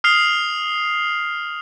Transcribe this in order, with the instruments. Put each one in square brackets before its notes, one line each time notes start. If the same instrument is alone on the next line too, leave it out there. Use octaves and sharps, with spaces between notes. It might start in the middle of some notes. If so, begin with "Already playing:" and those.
[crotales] D#6 F6 C7 F7